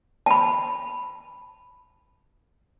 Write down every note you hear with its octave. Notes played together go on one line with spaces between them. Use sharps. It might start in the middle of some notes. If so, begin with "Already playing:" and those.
A5 B5